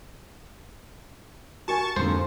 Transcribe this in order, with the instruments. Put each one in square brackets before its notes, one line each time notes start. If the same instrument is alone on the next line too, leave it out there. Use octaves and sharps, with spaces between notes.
[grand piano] F#4 A#4 G#5 [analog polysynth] A5 C#6
[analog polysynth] F2 [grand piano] G#2 D3 A#3 [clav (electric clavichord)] C5